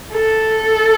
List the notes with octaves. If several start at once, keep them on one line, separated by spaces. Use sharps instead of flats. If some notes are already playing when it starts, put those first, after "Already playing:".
A4